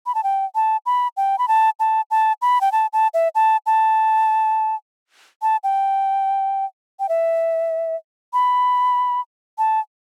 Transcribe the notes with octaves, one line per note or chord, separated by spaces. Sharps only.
B5
A5
G5
A5
B5
G5
B5
A5
A5
A5
B5
G5
A5
A5
E5
A5
A5
A5
G5
G5
E5
B5
A5